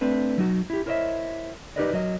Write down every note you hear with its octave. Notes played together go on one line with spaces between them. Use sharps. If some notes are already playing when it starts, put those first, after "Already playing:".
A3 C4 D4 B4
F#3 D#4 F#4
E4 G4
E4 A#4 C5 C#5 D#5 E5
D#4 G4 A#4 B4 D5 D#5
F#3 A#4 D#5